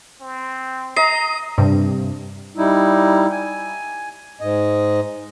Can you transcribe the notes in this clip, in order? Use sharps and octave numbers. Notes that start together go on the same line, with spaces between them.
C4
D#5 A#5 C7
G2 C3
G3 D#4 E4
G#5
G#2 D#5